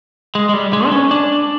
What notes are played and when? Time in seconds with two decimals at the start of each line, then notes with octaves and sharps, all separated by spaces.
0.35 G#3
0.49 G#3
0.53 G3
0.73 G#3
0.86 D4
0.92 C#4
1.11 D4